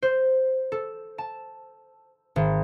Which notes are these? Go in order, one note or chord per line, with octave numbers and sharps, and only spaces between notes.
C5
A4
A5
G#1